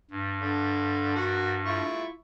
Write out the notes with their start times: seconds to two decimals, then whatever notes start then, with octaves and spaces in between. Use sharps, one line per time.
0.11 G2
0.40 D3
1.15 F#4 A#4 F#5
1.66 E4 F4 C#6